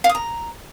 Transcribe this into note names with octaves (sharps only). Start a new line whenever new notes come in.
F5
D#6
A#5